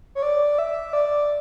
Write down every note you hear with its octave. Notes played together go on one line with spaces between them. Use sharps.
C#5
D5
E5
D5